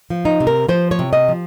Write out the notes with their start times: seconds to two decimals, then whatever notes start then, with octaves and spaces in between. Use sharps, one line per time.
0.10 F3
0.25 D#4
0.40 C3
0.47 A#4
0.68 F3 C5
0.91 C#5
0.99 C3
1.13 D#5
1.28 F3